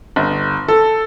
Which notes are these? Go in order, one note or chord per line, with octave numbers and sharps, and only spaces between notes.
G1
A4